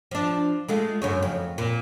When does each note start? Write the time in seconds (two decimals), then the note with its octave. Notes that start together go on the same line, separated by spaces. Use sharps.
0.11 F3 D4
0.68 G#3 A3 F4
1.02 F#2 C#3 C#5
1.22 F2
1.58 A#2